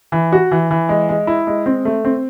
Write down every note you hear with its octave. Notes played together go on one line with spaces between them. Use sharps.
E3
F#4
E3
E3
G#3
G#3
E4
G#3
C4
A3
C4